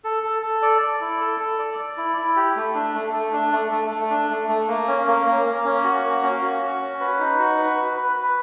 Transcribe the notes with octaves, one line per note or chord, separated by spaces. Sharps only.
A4
A4
A4
D5
D5
E4
A4
A4
D5
D5
E4
E4
G4
A3
D4
A3
A3
D4
A3
A3
A3
D4
A3
A3
A#3
C#4
A#3
A#3
A#3
C#4
F#4
A#3
C#4
F#4
F#4
C#4
B4
D#4
F#4
B4
B4
B4
B4